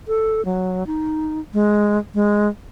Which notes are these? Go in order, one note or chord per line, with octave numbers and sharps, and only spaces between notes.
A4
F#3
D#4
G#3
G#3